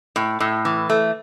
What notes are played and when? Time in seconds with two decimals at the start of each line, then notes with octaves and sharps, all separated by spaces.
0.16 A2
0.40 A2
0.65 E3
0.90 A3